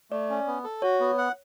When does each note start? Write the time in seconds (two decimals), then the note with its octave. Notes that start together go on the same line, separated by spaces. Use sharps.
0.11 A3 D5
0.30 C#4
0.47 B3
0.64 A4
0.82 F#4 C#5
1.00 B3
1.18 F#5